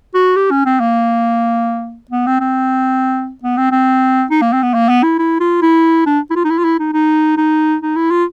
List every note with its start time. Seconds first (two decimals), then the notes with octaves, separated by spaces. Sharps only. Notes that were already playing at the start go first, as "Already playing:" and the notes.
0.14 F#4
0.36 G4
0.51 C#4
0.65 C4
0.80 A#3
2.11 B3
2.26 C4
2.40 C4
3.43 B3
3.57 C4
3.71 C4
4.31 D#4
4.41 A#3
4.53 C4
4.63 B3
4.74 A#3
4.89 B3
5.03 E4
5.19 E4
5.40 F4
5.62 E4
6.06 D4
6.30 E4
6.36 F4
6.44 D#4
6.50 E4
6.58 F4
6.64 E4
6.79 D#4
6.93 D#4
7.37 D#4
7.82 D#4
7.96 E4
8.11 F4